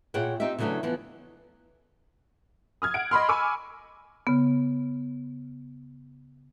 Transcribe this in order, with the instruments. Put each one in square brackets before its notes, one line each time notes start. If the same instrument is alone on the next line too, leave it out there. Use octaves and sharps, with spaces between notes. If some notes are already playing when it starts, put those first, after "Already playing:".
[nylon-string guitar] A#2 E4 G#4 C#5 F#5 G5
C4 D#4 F4 G4 E5
C#3 E3 F#3 A3 C#4 D4
E3 F3 B3
[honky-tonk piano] D#6 F6 G#6
F#5 D7
D#5 B5 C6 F6
G#5 B5 C#6 D6 E6
[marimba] C#3 B3